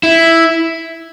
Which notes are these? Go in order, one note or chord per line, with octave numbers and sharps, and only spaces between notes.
E4